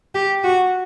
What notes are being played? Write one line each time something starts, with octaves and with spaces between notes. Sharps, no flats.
G4
F#4